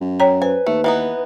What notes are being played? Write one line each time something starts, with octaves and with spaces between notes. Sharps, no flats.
F#2
C#5 G5 A#5
B4 C5 G#5
D#2 A3
E3 B3 D#4